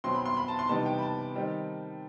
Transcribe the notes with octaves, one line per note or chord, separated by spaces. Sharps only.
B2 F#3 C4 C6
B5
C6
B5
A5
C6
C3 E3 G3 B3 D#4 A5
G5
B5
A5
D#3 G3 C4 D#4